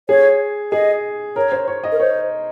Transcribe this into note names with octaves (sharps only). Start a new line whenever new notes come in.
G#4 C#5
G#4 D#5
A#4 C#5
C5
C#5
D#5
A#4
C5 C#5